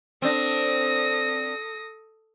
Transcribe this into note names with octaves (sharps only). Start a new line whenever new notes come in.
C4 D4 A4 D#6 A#6